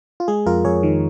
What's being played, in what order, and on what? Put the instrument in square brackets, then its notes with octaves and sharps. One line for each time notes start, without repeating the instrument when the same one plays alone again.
[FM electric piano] F4
G#3 G#4
F2 F4 A#4
F2 G#4 C#5
D#3